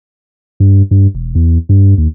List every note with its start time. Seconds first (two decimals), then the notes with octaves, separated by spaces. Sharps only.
0.60 G2
0.91 G2
1.14 E1
1.35 E2
1.69 G2
1.98 D#2